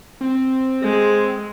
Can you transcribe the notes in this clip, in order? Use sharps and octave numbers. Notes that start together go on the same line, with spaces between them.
C4
G#3 G#4